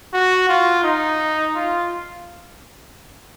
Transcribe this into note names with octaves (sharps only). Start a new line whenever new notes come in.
F#4
F4
D#4
F4